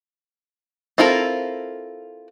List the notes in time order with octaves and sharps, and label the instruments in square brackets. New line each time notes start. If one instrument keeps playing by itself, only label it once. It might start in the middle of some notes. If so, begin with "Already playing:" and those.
[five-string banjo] C4 E4 F4 A4 A#4